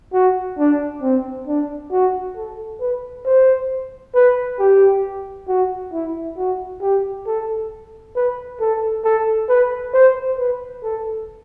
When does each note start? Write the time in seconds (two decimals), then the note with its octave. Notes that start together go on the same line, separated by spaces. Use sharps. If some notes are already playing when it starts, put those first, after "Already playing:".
0.14 F#4
0.59 D4
1.02 C4
1.47 D4
1.92 F#4
2.36 A4
2.81 B4
3.26 C5
4.15 B4
4.59 G4
5.48 F#4
5.93 E4
6.37 F#4
6.81 G4
7.27 A4
8.16 B4
8.60 A4
9.05 A4
9.49 B4
9.94 C5
10.38 B4
10.83 A4